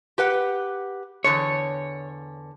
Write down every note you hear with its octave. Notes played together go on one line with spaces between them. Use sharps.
G4 B4 F#5
E2 D3 C#5